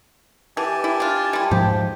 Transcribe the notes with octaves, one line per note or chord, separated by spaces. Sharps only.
E3 G4 G#5 A5
E4
D4 F4
G3 E4
G#2 F3 G4